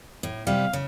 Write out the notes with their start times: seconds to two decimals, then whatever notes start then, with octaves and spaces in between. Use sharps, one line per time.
0.23 A2
0.47 C3 G3 F5
0.73 C#3